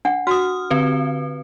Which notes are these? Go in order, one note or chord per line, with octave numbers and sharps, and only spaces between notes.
D4 F#5
F#4 D#6 F6
D3 C4 B4